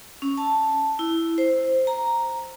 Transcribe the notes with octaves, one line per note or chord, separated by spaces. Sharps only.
C#4
A5
E4
C5
A#5